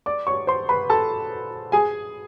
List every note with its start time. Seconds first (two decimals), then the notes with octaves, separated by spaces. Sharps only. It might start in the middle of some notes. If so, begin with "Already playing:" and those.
0.06 D5 D6
0.27 C#5 C#6
0.47 C5 C6
0.69 B4 B5
0.90 A4 A5
1.72 G#4 G#5